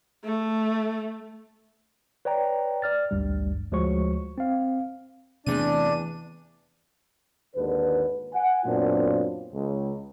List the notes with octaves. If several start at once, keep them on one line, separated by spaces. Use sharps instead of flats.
A3
B4 C#5 D5 G5 A#5
D5 F6 A6
A1 D2 G2 G3
D2 F3 G#3 F#4 C#5 C#6
C4 F5
E2 C3 A3 D4 D5 D#7
G#1 D#2 D3 B4
F#5 G#5
F#2 A#2 B3 C4 D4 F4
C#2